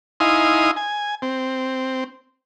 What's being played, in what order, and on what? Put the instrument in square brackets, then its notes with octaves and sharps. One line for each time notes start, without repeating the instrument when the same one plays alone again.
[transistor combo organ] D#4 E4 F5 G#5 C6 D#6
G#5
C4